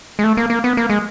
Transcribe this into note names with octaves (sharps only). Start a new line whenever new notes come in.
G#3
A3
A#3
A#3
B3
A#3
G#3